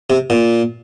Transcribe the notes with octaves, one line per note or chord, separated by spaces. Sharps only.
C3
A#2